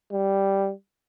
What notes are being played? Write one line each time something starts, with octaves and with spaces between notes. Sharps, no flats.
G3